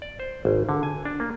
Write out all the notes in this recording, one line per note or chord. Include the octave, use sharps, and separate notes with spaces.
D5
C5
G#1
D3
G#5
D4
A#3